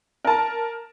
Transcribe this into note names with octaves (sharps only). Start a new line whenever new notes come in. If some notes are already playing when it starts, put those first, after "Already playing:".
A#4 A5